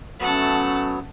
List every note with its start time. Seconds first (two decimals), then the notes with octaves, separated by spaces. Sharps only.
0.20 F#3 A3 B3 C#4 F#5 A5